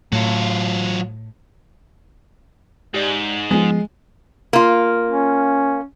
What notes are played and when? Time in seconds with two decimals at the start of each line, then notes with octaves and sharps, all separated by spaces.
0.12 A2 F#3 F4
2.94 G#2 G4 D5
3.51 F3 G#3 B3
4.53 A#3 F4
5.08 C#4